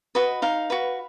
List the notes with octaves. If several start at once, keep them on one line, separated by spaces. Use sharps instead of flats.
F#4 B4 D#5
D#4 F5
F#4 B4